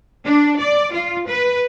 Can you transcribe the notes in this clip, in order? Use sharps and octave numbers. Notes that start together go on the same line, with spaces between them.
D4
D5
F4
B4